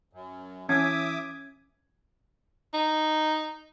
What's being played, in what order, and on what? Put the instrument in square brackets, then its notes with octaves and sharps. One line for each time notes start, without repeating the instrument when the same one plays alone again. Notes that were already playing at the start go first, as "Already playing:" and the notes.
[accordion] F#2
[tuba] E3 [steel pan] C#4 [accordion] E5 D6 D#6 [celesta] G#6
[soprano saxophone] D#4